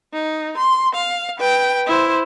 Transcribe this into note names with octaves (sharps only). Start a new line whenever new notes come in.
D#4
C6
F5
B4 G5
E4 C5